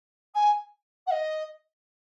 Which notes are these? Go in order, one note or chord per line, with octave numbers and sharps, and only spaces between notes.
G#5
F#5
D#5